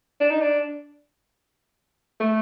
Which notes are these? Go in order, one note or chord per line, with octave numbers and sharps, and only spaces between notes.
D4
D#4
D4
A3